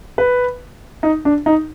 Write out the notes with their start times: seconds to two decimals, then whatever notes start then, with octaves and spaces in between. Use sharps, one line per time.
0.18 B4
1.03 D#4
1.25 D4
1.46 D#4